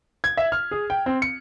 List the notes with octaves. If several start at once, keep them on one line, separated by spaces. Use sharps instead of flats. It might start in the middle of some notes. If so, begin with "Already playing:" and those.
G#6
E5
F6
G#4
G5
C4
C#7